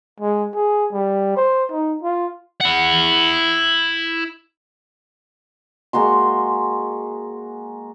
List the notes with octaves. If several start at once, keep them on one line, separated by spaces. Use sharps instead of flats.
G#3
G#4
G3
C5
D#4
F4
E4 F#5
G#3 A#3 F#4 C6